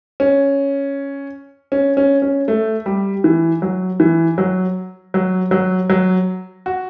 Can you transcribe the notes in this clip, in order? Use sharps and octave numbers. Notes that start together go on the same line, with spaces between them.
C#4
C#4
C#4
C#4
A3
G3
E3
F#3
E3
F#3
F#3
F#3
F#3
F#4